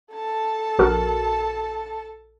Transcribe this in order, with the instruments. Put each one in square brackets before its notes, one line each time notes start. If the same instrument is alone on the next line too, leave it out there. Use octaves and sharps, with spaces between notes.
[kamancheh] A4 A5
[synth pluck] A#1 F#4 A#4